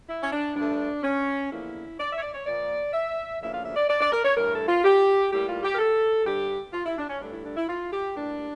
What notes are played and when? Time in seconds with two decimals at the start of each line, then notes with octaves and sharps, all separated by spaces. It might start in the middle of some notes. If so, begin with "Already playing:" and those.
0.09 E4
0.23 C#4
0.33 D4
0.56 G2 F3 A3 D4
1.03 C#4
1.51 E2 D3 F3 A#3 E4
1.99 D5
2.11 E5
2.17 C#5
2.22 D5
2.34 C#5
2.46 A#2 F3 A#3 D5
2.93 E5
3.41 D2 C#3 F3 A#3 E5
3.53 F5
3.65 E5
3.76 D5
3.89 D5
4.01 D5
4.12 A#4
4.25 C#5
4.36 G2 E3 A3 A#4
4.53 A4
4.68 F4
4.84 G4
5.31 A2 G3 A#3 G4
5.47 F4
5.63 G4
5.73 A#4
5.79 A4
6.26 G2 D3 G3 G4
6.73 F4
6.86 E4
6.98 D4
7.09 C#4
7.21 G2 D3 A3 D4
7.33 E4
7.46 D4
7.57 E4
7.69 F4
7.92 G4
8.16 A2 G3 A#3 D4